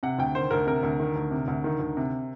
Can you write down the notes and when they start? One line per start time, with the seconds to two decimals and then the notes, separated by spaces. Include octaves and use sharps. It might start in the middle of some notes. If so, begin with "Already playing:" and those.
0.03 C3 F#5
0.18 D2 G5
0.35 D#3 C5
0.51 D2 A#4
0.67 C3 A#4
0.83 D2
1.00 D#3
1.16 D2
1.31 C3
1.48 D2
1.64 D#3
1.79 D2
1.97 C3